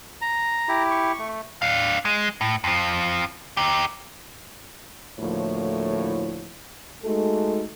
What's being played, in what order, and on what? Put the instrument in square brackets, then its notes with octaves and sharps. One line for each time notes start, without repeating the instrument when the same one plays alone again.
[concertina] A#5
[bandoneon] E4 G4
[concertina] C#6
[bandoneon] A3
[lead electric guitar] D4 F5
G#3
A2
F2 F3
D#4 G4
[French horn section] D2 A2 F3 A#3 E4 C#5
G#3 A3 D#4 F#4 A4